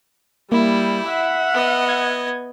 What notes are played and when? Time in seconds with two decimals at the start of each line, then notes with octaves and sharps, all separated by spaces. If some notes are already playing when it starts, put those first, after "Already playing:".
0.52 G3 A#3 E4
1.09 E5 F#5 B6
1.54 B3 D#5
1.89 G#6